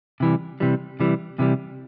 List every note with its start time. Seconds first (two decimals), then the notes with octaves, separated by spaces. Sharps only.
0.20 C3 E3 G3
0.60 C3 E3 G3
1.00 C3 E3 G3
1.39 C3 E3 G3